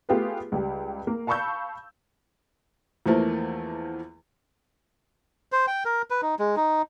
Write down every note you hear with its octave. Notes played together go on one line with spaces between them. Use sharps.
A3 B3 F4 G4 G#4 B4
C#2 G3 G4
A#3
F5 A5 B5 C#6 E6 G6
E2 E3 F3 A3 A#3
C5
G5
A#4
B4
D#4
G#3
D#4